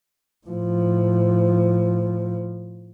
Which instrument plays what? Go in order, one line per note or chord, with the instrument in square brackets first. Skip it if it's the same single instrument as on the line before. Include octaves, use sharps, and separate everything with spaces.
[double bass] A2 F3